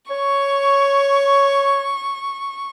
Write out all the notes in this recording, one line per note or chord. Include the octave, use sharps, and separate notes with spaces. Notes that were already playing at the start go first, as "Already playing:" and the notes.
C#5 C#6